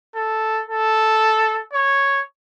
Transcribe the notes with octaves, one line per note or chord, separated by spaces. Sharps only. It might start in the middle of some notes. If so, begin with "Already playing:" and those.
A4
A4
C#5